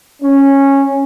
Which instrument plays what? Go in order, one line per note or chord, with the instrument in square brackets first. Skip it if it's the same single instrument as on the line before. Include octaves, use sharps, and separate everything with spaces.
[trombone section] C#4